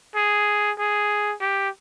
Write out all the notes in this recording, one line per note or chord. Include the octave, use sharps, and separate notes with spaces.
G#4
G#4
G4